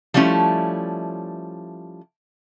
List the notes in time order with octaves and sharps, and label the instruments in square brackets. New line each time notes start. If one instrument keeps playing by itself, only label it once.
[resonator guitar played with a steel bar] F3 G3 A3 C#4 E4